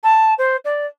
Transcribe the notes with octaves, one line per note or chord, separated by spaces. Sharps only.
A5
C5
D5